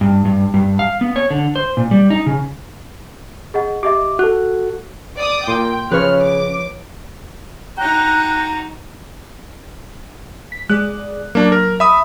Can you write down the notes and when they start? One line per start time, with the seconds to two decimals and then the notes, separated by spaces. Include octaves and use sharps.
0.01 G2
0.25 G2
0.54 G2
0.79 F5
1.01 B3
1.16 C#5
1.31 D3
1.56 C5
1.77 A#2
1.91 G3
2.10 D#4
2.26 C#3
3.54 G#4 D#5 F#5
3.83 G4 D#5 E5 D6
4.19 F#4 A4 F#6
5.18 D5 D6 D#6
5.48 A#2 G5 C6
5.92 C#3 F3 B4 C#5 F6
6.23 D6
7.78 D#4 F#4 G5 A#5 F#6
10.52 B6
10.70 G#3 G#4 D5 F#6
11.35 F#3 A#3 D4
11.52 A#4
11.80 E5 B5 D#6